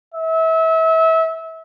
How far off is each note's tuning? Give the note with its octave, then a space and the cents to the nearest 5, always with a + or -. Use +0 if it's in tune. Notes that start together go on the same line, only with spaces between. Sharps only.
E5 -30